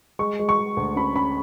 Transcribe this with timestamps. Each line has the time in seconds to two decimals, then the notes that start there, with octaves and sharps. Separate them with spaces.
0.19 G#3 C#6
0.39 G#3
0.49 C#6
0.58 G#3
0.77 D2
0.96 C#4 B5
1.15 C#4 B5